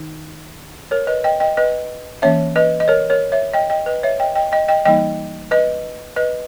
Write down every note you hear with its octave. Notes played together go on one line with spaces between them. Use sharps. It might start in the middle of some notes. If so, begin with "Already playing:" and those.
Already playing: D#3 D#4
A#4 C#5
B4 D#5
D#5 G5
D#5 G5
B4 D#5
E3 A#3 C#4 C#5 E5
B4 D#5
D#5
A#4 C#5
A#4 C#5
C#5 E5
D#5 G5
D#5 G5
B4 D#5
C#5 E5
D#5 G5
D#5 G5
D#5 G5
D#5 G5
E3 G3 A#3 D#4 D#5 G5
B4 D#5
B4 D#5